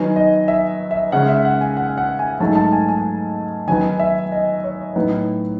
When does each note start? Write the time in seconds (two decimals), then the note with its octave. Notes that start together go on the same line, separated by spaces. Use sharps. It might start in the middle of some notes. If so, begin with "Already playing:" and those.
Already playing: D#3 F#3 B3 D#4 G#5
0.16 D#5
0.48 E5
0.91 E5
1.12 C#3 G#3 C#4 F#5
1.28 E5
1.45 F#5
1.61 G#5
1.77 F#5
1.97 F#5
2.19 G#5
2.40 G#2 F#3 A3 D#4 A5
2.56 A5
2.72 G#5
2.88 G#5
3.67 D#3 F#3 B3 D#4 G#5
3.99 E5
4.32 D#5
4.64 C#5
4.96 A2 F#3 B3 D#4